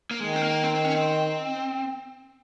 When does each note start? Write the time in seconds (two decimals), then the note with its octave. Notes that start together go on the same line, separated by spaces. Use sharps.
0.11 A#3
0.20 D#3 G#3
0.36 C4
0.42 A#3
0.63 C4
0.74 C4
0.85 C#4
0.95 C4